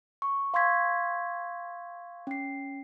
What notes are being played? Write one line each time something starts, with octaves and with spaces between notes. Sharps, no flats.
C#6
F5 C6 C#6 E6 G#6 B6
C#4 C7